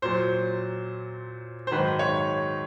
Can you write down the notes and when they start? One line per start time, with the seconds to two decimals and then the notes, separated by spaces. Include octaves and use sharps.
0.02 A#2 F#3 C5
1.67 C5
1.71 G#2 D#3 F#3 B4
1.99 C#5